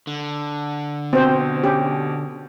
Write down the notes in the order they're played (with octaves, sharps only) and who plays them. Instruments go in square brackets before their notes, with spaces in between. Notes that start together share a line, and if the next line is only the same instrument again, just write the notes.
[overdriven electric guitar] D3
[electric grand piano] B2 [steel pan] C4 C5
[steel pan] C#4 G4